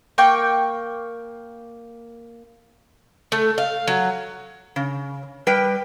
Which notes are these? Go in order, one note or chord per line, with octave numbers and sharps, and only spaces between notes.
A#3 G5 C#6
A3
F5
F#3
C#3
G3 B4 G5